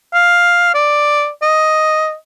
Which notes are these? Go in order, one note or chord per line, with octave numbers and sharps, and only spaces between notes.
F5
D5
D#5